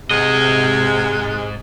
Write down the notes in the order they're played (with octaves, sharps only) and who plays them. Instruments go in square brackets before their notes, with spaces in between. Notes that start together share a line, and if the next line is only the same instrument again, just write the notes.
[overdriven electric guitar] G#2 D#5 [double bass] C3 [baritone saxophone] G#3